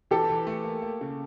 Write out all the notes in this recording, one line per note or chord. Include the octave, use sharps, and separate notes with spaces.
E3 G4 A4
E3
A3
A#3
A#3
C#3